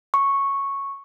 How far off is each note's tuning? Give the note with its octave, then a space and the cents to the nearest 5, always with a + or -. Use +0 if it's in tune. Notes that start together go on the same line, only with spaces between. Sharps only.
C#6 -5